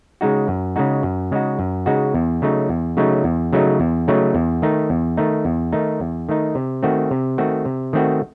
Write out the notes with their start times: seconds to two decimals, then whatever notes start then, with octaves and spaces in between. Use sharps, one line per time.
0.21 C#3 G#3 D#4 F#4
0.48 F#2
0.76 C#3 G#3 D#4 F#4
1.03 F#2
1.31 C#3 G#3 D#4 F#4
1.59 F#2
1.86 C#3 G#3 D#4 F#4
2.14 E2
2.42 C#3 F#3 A3 D#4
2.69 E2
2.97 C#3 F#3 A3 D#4
3.24 E2
3.53 C#3 F#3 A3 D#4
3.80 E2
4.08 C#3 F#3 A3 D#4
4.35 E2
4.62 D#3 A3 D#4
4.90 E2
5.17 D#3 A3 D#4
5.45 E2
5.73 D#3 A3 D#4
6.00 E2
6.29 D#3 A3 D#4
6.55 C3
6.83 D#3 A3 C4 F#4
7.11 C3
7.38 D#3 A3 C4 F#4
7.65 C3
7.93 D#3 A3 C4 F#4